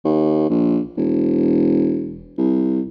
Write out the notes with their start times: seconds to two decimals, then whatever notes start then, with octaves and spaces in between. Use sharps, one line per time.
0.05 D#2
0.50 A#1
0.98 E1
2.38 C2